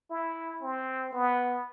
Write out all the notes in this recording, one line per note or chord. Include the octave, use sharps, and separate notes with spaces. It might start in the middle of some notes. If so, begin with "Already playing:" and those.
E4
C4
B3